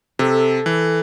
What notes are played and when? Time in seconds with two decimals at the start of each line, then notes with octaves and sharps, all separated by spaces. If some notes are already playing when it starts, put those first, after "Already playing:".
0.19 C3 A4
0.66 E3